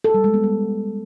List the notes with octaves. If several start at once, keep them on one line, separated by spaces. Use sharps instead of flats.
A4
G3
G#3
B3
G3